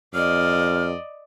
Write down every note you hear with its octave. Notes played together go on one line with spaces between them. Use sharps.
F2 D5 D#5 F6